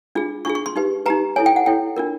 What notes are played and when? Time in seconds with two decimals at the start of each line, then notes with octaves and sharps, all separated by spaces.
0.15 D4 F4 G#4
0.45 D4 F4 G#4 C#6
0.55 C#6
0.66 C6
0.76 D#4 G4 B4
1.06 D#4 G4 B4 A#5
1.36 E4 A4 C#5 G#5
1.46 G5
1.56 F#5
1.66 E4 A4 C#5 G5
1.96 D4 F4 A#4